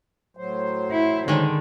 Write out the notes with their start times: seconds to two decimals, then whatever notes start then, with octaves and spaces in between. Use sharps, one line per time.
0.37 A2 F#3 C5
0.92 E4
1.28 D3 D#3 G#3